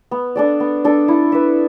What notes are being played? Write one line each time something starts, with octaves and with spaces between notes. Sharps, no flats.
B3
D4 A4 D5
B3
D4 A4 D5
E4
B4 E5